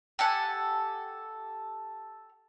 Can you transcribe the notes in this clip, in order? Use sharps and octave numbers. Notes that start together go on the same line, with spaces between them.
G4 A4 F#5 G#5